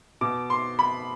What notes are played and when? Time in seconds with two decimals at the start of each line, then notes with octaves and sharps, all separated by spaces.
0.21 B2 D6
0.50 C6
0.79 B5